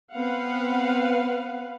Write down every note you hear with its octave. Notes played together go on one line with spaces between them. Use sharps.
B3 C4 B4 F5 F#5